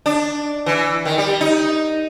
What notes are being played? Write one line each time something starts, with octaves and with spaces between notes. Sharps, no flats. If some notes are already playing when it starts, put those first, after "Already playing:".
D4
E3
D#3
G3
D#4